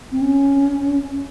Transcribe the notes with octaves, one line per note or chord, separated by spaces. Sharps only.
C4
C#4